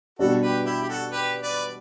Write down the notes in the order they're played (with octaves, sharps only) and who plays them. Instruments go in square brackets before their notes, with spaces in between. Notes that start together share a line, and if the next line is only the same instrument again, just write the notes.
[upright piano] B2 G3 D4 [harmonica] F#4 A4
[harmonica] G4 B4
E4 G4
G4
F#4 A4
G4 B4
B4 D5